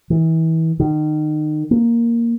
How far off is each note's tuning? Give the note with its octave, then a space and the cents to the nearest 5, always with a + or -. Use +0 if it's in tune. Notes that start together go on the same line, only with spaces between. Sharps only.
E3 -30
D#3 -30
A#3 +0